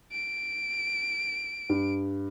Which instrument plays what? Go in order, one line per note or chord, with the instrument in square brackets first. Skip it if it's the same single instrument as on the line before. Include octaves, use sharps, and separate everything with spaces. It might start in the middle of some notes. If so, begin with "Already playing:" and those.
[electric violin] D7
[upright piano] G2